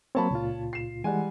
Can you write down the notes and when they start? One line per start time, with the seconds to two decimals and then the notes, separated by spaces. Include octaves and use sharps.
0.15 F#3 A#3 C4 C#5 A5 B5
0.31 C#2 A#2 F4
0.73 C7 E7
1.04 E3 G3 G#3 F#5 G#5